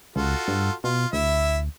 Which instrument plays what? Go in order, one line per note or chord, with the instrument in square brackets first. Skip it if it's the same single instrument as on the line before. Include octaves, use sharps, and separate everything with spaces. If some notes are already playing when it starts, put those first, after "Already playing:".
[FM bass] C#2 [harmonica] F4 F#4 A4
[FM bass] G2
[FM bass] B2 [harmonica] F4
[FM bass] D2 [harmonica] E4 E5